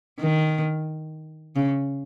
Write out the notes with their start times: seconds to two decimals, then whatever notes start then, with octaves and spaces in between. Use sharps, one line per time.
0.20 D#3
1.56 C#3